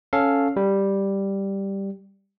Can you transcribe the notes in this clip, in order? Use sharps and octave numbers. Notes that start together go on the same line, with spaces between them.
C#4 A4 F5
G3